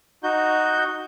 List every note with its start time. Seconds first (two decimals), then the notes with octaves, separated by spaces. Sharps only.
0.23 D#4 F#4 G6